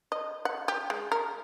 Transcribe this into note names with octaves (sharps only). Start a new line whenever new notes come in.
D#5
F#5
G4
G#3
A#4